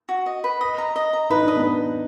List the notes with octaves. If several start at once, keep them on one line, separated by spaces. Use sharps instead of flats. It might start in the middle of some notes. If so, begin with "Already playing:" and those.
F#4
D#5
B4
D#5
A#5
D#5
A#5
D#4 B4
D4 D#5
B3